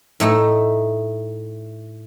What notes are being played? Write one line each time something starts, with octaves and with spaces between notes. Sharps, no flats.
A2 A3 D#4